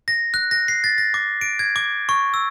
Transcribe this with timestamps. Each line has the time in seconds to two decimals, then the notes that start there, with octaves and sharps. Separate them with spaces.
0.08 A#6
0.34 F#6
0.51 A#6
0.68 C7
0.84 A6
0.98 A#6
1.14 D6
1.41 D7
1.59 G#6
1.76 D6
2.09 C#6
2.34 E6